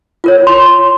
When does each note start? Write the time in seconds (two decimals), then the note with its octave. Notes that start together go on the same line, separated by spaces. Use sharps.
0.24 F4 A#4 C#5
0.47 C6